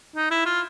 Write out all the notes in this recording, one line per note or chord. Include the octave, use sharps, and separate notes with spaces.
D#4
E4
F4